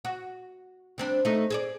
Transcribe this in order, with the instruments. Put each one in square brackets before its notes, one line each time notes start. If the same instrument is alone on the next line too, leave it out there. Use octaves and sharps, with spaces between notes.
[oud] F#4
G3 C4 D4
A3 D#4
G#4 C5 D5